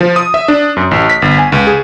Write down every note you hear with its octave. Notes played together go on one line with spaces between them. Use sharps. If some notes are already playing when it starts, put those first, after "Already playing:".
F3
D#6
E5
D4
F#2
A1
B6
G1
G#5
C#2
G#4